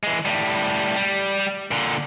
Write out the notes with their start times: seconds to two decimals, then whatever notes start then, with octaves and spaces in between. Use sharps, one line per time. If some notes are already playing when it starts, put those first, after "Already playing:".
0.03 E3 G#3
0.25 A2 G3
0.96 G3
1.71 A#2 D3